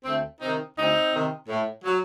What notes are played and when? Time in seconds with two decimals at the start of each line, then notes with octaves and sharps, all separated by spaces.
0.04 D2 A3 C4
0.41 C3 D#3 C4 D#4
0.76 D2 C4 D#4
1.12 C3 D#3
1.48 A2
1.84 F#3